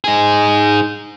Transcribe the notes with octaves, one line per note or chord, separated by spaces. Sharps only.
D#4 G#4